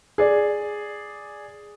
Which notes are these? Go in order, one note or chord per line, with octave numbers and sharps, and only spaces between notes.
G#4 D5